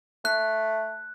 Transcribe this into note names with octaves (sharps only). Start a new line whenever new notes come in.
A3 F#6